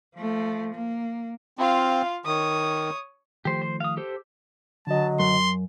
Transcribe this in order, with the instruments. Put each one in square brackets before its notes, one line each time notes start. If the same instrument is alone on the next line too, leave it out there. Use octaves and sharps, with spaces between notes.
[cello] F3 A3
A#3
[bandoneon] C4 [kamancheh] F4 F5
[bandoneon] D#3 [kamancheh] C#5 D#6
[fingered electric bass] D#3 F3 A3 [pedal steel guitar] G4 C5
[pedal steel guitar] C5
F5 D#6
G4 A4 C5
[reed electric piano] D3 D#5 [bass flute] F#3 [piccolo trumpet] A5
[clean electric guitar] F#2 [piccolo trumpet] C6